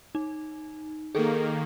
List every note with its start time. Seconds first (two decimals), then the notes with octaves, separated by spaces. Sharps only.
0.15 D#4
1.15 D#3 A#3 G#4 A4